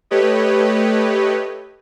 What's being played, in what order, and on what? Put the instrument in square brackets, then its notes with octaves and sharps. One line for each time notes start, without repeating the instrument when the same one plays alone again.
[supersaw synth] A3 G4 B4 C#5 D#5